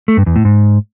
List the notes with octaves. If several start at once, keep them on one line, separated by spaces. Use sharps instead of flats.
A3
G2
E2
A2
G#2